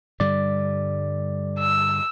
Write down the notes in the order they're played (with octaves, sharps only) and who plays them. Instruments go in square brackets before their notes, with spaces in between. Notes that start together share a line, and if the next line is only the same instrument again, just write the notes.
[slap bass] G2 D3 G3 [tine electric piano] D5
[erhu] E6